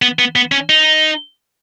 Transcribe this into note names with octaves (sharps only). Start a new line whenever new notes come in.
B3
B3
B3
C#4
D#4